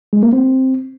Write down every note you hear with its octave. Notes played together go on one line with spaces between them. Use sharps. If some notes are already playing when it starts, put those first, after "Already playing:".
G#3
A#3
C4